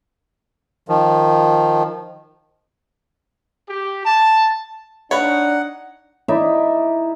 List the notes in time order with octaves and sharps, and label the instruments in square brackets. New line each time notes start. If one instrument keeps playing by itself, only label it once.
[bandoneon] D#3 F3
[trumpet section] G4
A5
[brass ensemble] D4 D#4 [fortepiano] C#5 B5 [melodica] F#5
[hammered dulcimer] D#4 E4 D5 E5